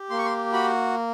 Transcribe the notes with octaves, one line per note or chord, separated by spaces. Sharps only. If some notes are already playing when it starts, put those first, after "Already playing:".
Already playing: G4
A#3 C6
C#6
C6
F#4 B5